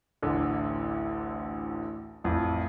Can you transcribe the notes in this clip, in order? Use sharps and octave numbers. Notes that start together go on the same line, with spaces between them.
A1 D2 D3
A1 F2